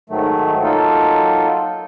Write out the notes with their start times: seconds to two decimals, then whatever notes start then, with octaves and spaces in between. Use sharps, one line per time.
0.10 G#2 D#3 F#3 A3
0.63 F#3 A#3 D#4 F4 A4